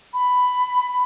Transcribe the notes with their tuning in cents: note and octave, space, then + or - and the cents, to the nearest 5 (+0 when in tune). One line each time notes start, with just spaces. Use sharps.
B5 +10